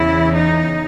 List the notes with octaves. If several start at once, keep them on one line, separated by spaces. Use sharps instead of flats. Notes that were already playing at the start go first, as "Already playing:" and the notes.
Already playing: E2 C#3 E3 E4
D#4